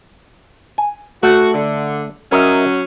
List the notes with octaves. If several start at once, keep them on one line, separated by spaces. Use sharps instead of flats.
G#5
A3 F#4
D3
F#3 C#4 A#4 D#5 E5